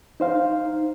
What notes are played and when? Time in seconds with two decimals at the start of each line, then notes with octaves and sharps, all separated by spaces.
0.20 D#4 C5 F5